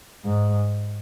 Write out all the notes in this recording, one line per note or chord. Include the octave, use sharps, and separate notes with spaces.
G#2